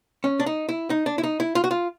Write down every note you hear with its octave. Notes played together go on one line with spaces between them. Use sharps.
C#4
D4
D#4
E4
D#4
D4
E4
D#4
E4
F4
F#4
F4